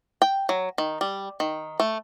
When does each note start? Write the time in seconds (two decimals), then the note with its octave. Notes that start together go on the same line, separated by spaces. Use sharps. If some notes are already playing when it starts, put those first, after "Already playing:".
0.22 G5
0.49 F#3
0.78 D#3
1.01 G3
1.40 D#3
1.80 A3